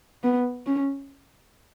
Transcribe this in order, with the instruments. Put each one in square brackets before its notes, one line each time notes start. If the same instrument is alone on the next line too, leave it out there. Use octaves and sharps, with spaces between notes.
[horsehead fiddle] B3
C#4